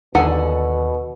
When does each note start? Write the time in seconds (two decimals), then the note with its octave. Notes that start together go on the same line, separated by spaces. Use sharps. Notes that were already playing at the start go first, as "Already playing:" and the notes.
0.15 D#2 B2 D3 A4 F#5 G#5